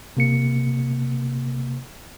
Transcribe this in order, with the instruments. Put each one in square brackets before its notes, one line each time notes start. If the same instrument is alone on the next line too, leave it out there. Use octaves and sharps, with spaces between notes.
[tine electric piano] C3 A#3 C#7